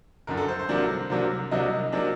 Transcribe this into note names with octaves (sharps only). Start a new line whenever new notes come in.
G1 F#2 D3 A#4
A4
C5
C5
C2 C3 F#3 A#3 D4
C2 C3 F#3 A#3 D4
C2 C3 F#3 A#3 D4 D#5
C3 F#3 A#3 D4